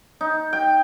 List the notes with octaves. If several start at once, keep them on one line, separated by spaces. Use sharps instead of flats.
D#4
G5